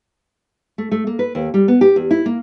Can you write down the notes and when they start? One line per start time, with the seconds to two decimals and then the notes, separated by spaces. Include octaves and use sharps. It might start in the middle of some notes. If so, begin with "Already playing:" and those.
0.78 A3
0.91 A3
1.07 A#3
1.19 B4
1.35 D#2
1.54 G3
1.68 B3
1.81 G4
1.96 E2
2.11 E4
2.26 A#3